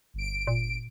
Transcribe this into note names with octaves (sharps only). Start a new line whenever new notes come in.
G1 D7
A#2